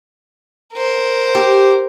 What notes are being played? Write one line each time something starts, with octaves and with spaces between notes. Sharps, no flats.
A#4 C5
G4